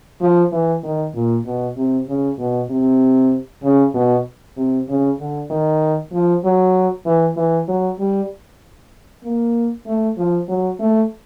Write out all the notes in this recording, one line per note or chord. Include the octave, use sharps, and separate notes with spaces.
F3
E3
D#3
A#2
B2
C3
C#3
B2
C3
C#3
B2
C3
C#3
D3
D#3
F3
F#3
E3
E3
F#3
G3
A#3
A3
F3
F#3
A3